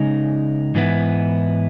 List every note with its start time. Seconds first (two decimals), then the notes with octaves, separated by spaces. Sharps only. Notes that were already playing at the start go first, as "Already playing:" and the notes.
Already playing: C#3 G#3 D#4
0.75 G#2 E3 B3 E4